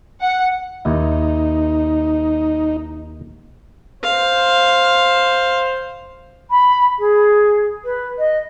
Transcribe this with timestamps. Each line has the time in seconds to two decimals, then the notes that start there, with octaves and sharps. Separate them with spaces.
0.20 F#5
0.85 D#2 D#4 E4
4.03 C5 F5
6.50 B5
6.99 G#4
7.84 B4
8.19 D#5